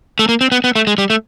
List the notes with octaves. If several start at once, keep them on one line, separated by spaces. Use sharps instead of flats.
A3
A#3
C4
B3
B3
A3
G#3
G3
A3